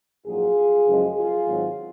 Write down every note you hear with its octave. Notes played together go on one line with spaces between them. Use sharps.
A#1 G#2 F#3 F4 G#4
F#1 F#2 C#3 F3 G#3
F4 G#4
G#1 G#2 F#3